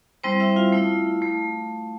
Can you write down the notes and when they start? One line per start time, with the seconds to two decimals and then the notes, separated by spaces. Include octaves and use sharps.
0.24 G3 C4 E4 C5
0.40 E4 E5
0.56 F4 F5
0.72 A3 E4
1.22 A3